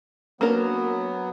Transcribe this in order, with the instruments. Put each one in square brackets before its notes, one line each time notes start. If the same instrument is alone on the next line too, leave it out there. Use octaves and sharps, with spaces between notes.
[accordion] F#3 B3 [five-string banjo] A#3 D4 A#4